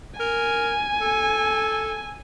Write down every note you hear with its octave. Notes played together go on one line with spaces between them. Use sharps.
A#4 G#5
A4